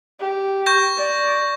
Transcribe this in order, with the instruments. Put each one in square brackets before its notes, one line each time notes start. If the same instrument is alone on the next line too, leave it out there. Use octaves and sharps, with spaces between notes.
[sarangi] G4
[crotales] C#6 G6 A#6
[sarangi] D5